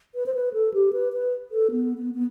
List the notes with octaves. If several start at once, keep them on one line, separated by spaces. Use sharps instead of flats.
B4
C5
B4
A4
G4
B4
B4
A4
B3
B3
B3